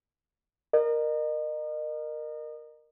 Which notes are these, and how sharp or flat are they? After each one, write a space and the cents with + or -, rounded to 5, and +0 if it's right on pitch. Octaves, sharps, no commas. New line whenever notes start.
A#4 +0 D#5 -35